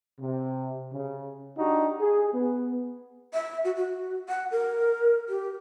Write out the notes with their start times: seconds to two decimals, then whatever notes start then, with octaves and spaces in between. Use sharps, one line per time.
0.20 C3
0.92 C#3
1.58 D4 D#4 F#4 G4
2.01 G#4
2.33 B3
3.34 E5
3.64 F#4
3.76 F#4
4.29 F#5
4.51 A#4
5.29 G4